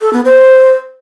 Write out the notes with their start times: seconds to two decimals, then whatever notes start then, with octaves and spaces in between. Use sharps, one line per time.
0.01 A4
0.13 B3
0.25 C5